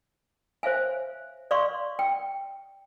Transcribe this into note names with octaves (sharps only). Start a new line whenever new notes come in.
C5 C#5 E5 F5 G#5
D5 F5 C6 C#6
G5